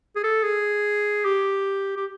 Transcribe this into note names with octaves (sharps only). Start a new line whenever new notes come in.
G#4
A4
G#4
G4
G4